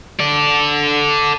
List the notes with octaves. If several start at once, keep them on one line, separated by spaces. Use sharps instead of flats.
A4 D5